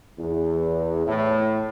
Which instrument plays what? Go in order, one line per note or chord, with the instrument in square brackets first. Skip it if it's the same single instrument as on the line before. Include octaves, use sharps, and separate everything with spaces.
[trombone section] E2
A2